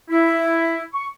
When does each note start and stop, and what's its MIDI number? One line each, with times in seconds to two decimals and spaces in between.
0.10 0.82 64
0.93 1.07 85